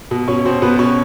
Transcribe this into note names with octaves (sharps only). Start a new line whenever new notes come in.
B2
B2 C#4 C#5
B2 C4 C5
B2 B3 B4
B2 C#4 C#5